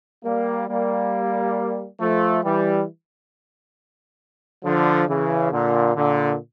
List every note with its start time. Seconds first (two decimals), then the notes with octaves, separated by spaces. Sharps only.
0.25 G3 A#3
0.68 G3 A#3
2.00 F3 A3
2.44 E3 G3
4.63 D3 F3
5.08 C#3 E3
5.52 A#2 D3
5.95 A#2 D3